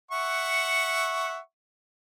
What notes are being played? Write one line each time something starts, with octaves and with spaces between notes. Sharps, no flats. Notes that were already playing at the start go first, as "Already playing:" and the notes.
E5 F#5 C#6